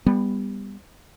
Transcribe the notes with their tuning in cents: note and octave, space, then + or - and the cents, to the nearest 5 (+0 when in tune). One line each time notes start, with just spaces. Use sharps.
G3 +25 B3 +0